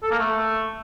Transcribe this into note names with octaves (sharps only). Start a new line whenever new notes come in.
A4
A#3
A3